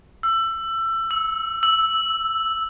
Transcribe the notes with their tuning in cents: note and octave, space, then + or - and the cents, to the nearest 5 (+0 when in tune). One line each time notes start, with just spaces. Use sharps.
E6 +25
E6 -10
E6 +0